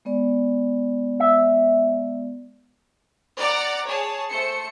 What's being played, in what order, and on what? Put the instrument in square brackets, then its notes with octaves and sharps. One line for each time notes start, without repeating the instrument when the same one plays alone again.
[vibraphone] G#3 B3 D5
[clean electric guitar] E5
[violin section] D5 F#5 A#5 D6 A6
G#4 C#5 A5
A3 C5 C#7